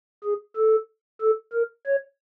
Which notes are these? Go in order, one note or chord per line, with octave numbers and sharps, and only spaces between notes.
G#4
A4
A4
A#4
C#5